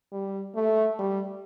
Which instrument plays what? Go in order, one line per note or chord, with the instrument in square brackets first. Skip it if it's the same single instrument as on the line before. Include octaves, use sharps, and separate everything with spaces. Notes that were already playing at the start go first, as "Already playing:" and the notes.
[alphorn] G3
A3
G3